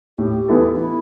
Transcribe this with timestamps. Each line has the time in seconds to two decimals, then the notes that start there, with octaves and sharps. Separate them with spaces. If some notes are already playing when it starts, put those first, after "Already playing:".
0.18 A2 G4
0.48 E3 B3 E4 A4
0.75 D4
0.79 E4